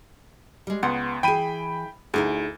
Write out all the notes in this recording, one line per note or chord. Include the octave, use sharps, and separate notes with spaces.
G3 G#3
C#2 B3 F#5 C6
E3 G#4 G5 B5 D#7
D2 D#4 E4 G#4